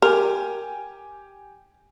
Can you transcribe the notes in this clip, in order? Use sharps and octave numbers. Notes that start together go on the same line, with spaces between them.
G4 A#4 G5 G#5